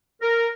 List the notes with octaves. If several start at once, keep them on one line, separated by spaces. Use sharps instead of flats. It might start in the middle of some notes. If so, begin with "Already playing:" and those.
A#4